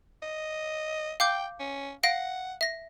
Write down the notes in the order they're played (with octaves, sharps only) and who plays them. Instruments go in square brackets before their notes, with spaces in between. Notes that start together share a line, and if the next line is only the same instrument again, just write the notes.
[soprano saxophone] D#5
[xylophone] F5 D6 G6 [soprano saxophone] G5
[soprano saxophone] C#4
[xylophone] F5 A#6 D7 [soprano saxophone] F#5
[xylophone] E5 A#6